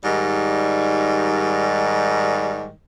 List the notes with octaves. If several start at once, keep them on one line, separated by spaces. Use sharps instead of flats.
G#2 D#3 G3